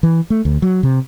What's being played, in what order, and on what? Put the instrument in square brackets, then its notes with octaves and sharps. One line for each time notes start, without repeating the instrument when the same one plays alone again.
[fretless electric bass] E3
A3
D2
F#3
C3